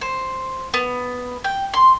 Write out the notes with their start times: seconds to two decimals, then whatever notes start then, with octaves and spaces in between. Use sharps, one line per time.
0.01 C5
0.74 B3
1.44 G5
1.74 C6